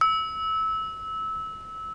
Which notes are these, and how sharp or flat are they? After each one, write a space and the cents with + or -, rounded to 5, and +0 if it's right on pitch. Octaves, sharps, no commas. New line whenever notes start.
E6 -20